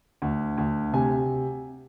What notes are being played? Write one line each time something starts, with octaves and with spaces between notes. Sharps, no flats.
D2
D2
C3 G#5